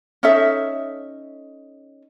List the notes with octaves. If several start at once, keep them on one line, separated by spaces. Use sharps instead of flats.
C#4 D#4 A4 E5